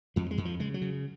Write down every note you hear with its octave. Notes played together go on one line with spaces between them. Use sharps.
F2 F3
G#3
F2
F3
C#3 G#3
F#3
C#3